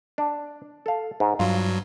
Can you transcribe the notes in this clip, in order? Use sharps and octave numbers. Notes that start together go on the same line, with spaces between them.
D4
A4 F5
G#2
G2 F#3 F4